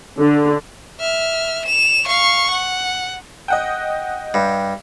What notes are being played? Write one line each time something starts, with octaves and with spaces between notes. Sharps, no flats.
D3
E5 F6
E7 F7
F5 C#6
F#5
D#5 F#5 G5
G2